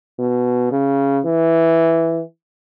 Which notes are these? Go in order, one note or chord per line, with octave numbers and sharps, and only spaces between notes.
B2
C#3
E3